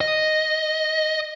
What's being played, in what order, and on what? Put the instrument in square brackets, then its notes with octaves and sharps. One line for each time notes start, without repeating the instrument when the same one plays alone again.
[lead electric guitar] D#5